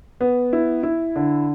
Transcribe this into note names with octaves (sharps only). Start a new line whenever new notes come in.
B3
E4
E4
D3